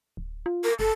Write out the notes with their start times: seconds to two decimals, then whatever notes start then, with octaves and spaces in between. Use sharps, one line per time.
0.17 D1
0.46 F4
0.64 A#4
0.79 F#1 A4